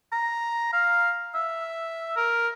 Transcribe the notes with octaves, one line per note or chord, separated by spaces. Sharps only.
A#5
F5
E5
A#4